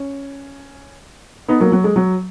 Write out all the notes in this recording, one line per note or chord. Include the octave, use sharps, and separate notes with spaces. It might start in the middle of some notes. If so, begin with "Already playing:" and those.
Already playing: C#4
B3 D#4
F#3 A#3
F#3
G#3
F#3